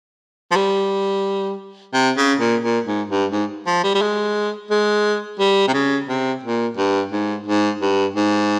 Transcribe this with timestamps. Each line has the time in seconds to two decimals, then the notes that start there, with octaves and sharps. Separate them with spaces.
0.51 F3
0.56 G3
1.93 C3
2.17 C#3
2.39 A#2
2.63 A#2
2.86 G#2
3.09 G2
3.32 G#2
3.66 F3
3.83 G3
3.95 G3
4.01 G#3
4.70 G#3
5.39 G3
5.68 C3
5.74 C#3
6.08 C3
6.43 A#2
6.77 G2
7.12 G#2
7.46 G#2
7.81 G2
8.16 G#2